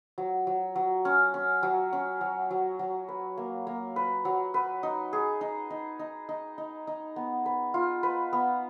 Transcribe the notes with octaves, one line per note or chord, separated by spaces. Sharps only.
F#3
F#3
F#3
C#4
C#4
F#3
C#4
F#3
F#3
F#3
B4
A#3
A#3
B4
F#3
B4
D#4
G#4
D#4
D#4
D#4
D#4
D#4
D#4
B3
B4
F4
B4
B3